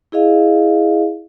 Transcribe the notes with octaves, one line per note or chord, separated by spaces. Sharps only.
E4 G#4 D#5 F5